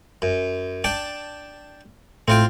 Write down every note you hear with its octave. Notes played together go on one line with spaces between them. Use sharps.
F#2
D4 G5 A5
A2 C4 F4 G5